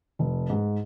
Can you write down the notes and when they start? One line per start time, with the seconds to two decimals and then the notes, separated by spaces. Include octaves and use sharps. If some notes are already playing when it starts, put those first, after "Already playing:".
0.19 F1
0.50 G#2